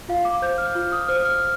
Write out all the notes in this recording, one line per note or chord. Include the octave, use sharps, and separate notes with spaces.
F4 F5
D6
C5 G6
F6
F4
D#6
C5 F6
F6